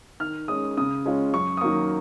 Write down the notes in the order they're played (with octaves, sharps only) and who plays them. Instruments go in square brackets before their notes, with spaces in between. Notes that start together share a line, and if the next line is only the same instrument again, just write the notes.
[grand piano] D#3 F6
G#3 C#4 D#6
C#3 D#6
G#3 C#4 F4
F#2 C#6
D#6
D#3 F#3 A#3 C#6